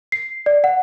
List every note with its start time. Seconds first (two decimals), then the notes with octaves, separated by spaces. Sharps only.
0.12 C7
0.46 D5
0.64 F#5